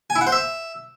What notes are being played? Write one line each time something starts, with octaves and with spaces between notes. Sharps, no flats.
G#5
E4
F#5
C5
E5